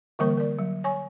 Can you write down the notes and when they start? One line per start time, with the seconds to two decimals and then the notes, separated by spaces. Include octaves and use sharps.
0.19 D3 E3 G3 A#3 A#4 C#6
0.37 A#4 D5
0.59 F#3
0.84 C#5 G#5 C#6